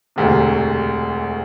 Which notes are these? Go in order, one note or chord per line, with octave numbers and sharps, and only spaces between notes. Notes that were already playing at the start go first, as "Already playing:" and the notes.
E1 D2 C3